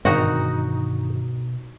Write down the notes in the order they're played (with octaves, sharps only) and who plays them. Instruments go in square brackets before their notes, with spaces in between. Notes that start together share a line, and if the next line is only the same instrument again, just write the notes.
[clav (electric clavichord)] G#1 [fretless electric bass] G2 D3 D#3 [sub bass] B2 [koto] D#4 F#4